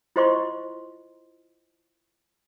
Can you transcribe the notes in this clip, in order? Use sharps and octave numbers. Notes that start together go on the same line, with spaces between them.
E4 F4 C5 D#5 C6 C#6